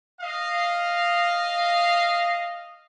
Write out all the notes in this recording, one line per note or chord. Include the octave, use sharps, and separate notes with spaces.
D#5 F5